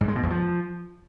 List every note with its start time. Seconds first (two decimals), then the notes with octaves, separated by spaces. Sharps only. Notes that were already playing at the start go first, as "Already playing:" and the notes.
0.01 G#2
0.08 G#3
0.15 B2
0.23 E2
0.30 F3